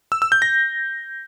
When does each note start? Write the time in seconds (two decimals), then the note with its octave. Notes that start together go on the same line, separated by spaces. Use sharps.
0.12 E6
0.22 E6
0.32 G6
0.42 A#6